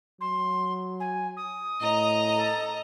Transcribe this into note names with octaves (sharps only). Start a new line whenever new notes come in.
F#3 C6
G#5
D#6
A2 D#5 A#5
A4